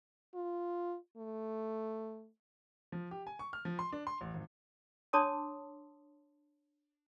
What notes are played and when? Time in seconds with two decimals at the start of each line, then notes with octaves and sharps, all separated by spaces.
0.35 F4
1.17 A3
2.92 F3
3.11 G4
3.27 G#5
3.39 C#6
3.53 F6
3.65 F3
3.79 C6
3.93 D4
4.07 C6
4.21 A1
4.34 G#1
5.13 D4 C#5 A5 C6 D6 D#6